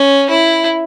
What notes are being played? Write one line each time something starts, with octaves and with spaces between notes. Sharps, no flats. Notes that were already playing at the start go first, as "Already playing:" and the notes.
Already playing: C#4
E4